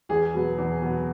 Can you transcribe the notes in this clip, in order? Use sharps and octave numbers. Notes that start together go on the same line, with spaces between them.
E2 G#4
B2 F#3 B3
E2
B2 F#3 B3